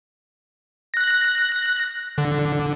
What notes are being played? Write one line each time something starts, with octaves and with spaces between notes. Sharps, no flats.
F#6 A#6
D3